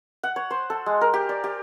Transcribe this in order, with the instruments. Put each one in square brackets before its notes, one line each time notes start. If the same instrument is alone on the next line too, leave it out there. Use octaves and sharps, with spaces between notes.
[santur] F#5
C#5
C5
A4
G#3
A#4
G4
D5
G4